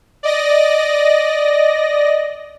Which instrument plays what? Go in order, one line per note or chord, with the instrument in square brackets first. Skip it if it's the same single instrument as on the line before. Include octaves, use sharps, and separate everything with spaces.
[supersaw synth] D5 D#5 A#6